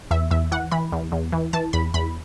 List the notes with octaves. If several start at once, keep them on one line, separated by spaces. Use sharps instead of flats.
E2 E5
E2 E5
E3 F#5
E3 B5
E2
E2
E3
E3 A5
E2 B5
E2 B5